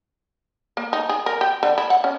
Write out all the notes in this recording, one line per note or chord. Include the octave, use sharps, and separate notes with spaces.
A#3
D#4
G#4
A#4
G4
D3
E4
F#5
C#4